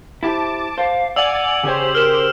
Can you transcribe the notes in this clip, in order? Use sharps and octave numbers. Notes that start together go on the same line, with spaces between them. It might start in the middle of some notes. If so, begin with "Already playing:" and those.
E4 G4 C5 A5 D6
C5 F5
D5 F5 F#5 G#5 D6 E6 F7 F#7
C#3 G4 G#4 C5 C#5
A#4 F6 E7